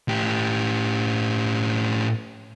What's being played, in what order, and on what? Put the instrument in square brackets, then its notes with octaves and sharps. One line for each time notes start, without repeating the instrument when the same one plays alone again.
[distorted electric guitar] A2 G4